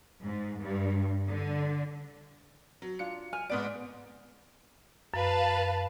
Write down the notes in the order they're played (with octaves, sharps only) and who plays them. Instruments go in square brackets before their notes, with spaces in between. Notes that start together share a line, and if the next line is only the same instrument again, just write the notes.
[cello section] G#2
G2
D3
[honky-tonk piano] F#3
[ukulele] D4 F4 [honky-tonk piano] C#7
[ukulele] G#5 [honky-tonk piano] F6
[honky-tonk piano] G#2 B3 D7 [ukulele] D5
[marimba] F#2 [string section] B4 F5 A5